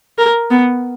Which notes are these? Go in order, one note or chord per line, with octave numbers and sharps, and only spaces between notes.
A#4
B3